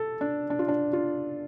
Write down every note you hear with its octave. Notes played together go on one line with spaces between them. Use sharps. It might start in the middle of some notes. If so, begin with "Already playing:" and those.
Already playing: A4
D4
D4
F4
D4
F4